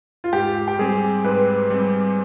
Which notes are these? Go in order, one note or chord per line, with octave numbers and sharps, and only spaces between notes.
F4
G#2 G4
G4
G3 C4 G#4
G#2 B4
G3 C4